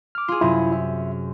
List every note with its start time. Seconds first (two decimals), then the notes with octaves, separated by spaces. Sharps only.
0.15 D6 F6
0.28 F4 G#4
0.41 F#2 C3 E4 F4
0.72 E5